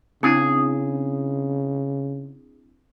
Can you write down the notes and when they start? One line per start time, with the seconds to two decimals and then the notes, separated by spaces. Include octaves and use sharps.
0.23 C#3 C4 D4 E4 G#4